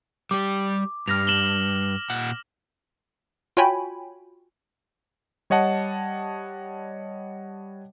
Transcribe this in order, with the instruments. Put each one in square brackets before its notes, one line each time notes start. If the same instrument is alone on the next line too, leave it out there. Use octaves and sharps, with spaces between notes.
[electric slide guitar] G3 G4 [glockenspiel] D6
[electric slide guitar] G2 [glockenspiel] F6 A#6 F7
[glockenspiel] E7 F#7 G7
[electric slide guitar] A#2 F#5
[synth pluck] F4 F#4 C#5 G5 G#5 B5
[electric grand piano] G3 C#5 D#5 F#5 A5